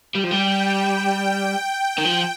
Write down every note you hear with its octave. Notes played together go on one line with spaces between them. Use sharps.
G3 G5
F3
G3
D#3
F3